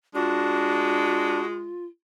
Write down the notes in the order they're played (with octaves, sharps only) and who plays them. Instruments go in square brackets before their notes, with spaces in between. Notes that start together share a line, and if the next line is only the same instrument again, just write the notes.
[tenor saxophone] G#3 [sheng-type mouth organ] D4 [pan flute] F4 [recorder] F#4